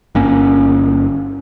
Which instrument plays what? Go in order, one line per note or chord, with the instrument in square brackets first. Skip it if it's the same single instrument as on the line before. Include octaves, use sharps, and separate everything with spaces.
[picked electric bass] G1 A#3 C#4